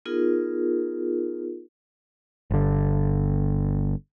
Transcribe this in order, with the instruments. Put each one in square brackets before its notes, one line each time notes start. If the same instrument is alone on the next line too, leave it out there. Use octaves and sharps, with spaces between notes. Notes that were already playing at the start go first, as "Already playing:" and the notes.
[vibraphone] B3 D#4 F4 G#4 A#4
[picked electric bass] G1 D3